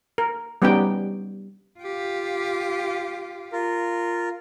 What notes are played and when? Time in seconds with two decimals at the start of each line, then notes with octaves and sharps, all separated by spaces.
0.18 A#4
0.62 G3 B3 C#4 D#4 G4 G5
1.79 F4 G4
3.52 F4 A#4